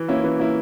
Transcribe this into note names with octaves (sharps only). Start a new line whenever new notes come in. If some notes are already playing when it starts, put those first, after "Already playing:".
Already playing: E3
A#3 C#4 E4
E3
A#3 C#4 E4